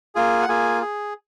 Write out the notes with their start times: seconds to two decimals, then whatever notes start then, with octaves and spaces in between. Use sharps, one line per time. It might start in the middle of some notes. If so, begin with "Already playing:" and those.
0.15 A#3 F4 G#4 G#5
0.42 F#5
0.48 A#3 F4 G#4 G#5
0.82 G#4